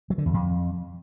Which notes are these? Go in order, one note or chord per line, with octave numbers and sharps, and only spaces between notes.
F#3
D3
E2
F2